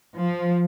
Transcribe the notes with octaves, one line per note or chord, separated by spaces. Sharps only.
F3